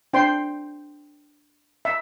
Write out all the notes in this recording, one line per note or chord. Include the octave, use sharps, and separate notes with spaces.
D4 C5 G5 C6
E5